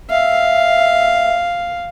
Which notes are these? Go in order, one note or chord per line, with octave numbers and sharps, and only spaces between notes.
E5 F5